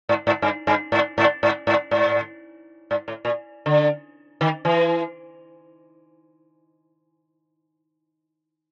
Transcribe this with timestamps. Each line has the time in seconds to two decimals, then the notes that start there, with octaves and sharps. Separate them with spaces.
0.09 G#2
0.27 G#2
0.42 G2
0.67 G2
0.92 G#2
1.18 G#2
1.43 G#2
1.67 G#2
1.91 G#2
2.91 G#2
3.08 A2
3.25 A#2
3.66 D3
4.41 D#3
4.65 E3